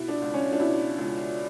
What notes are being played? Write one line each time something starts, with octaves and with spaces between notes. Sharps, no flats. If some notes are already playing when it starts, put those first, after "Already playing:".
Already playing: B2 E4
D4
C#2
C#4
D4
B2 E4
C#2